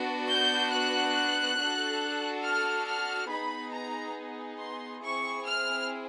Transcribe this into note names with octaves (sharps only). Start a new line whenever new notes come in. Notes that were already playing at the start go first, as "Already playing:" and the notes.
Already playing: B3 D4 F#4
G6
F#6
D4 F#4 A4
F6
F6
B3 D#4 G#4 B5
A#5
C6
C4 E4 G#4 C#6
F6